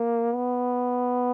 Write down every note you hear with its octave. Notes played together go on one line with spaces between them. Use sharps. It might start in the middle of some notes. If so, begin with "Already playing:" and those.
Already playing: A#3
B3